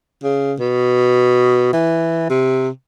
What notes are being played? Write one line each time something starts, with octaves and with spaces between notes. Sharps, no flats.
C#3
B2
E3
C3